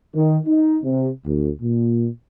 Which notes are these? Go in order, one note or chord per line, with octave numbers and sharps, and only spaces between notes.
D#3
D#4
C3
D2
A#2